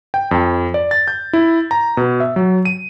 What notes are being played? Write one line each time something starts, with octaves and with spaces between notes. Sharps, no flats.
G5
F2
D5
A6
G6
E4
A#5
B2
E5
F#3
D#7